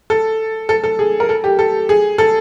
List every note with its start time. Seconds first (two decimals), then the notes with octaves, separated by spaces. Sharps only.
0.10 A4
0.69 A4
0.84 A4
0.99 G#4
1.20 A#4
1.29 A4
1.44 G4
1.59 A4
1.89 G#4
2.18 A4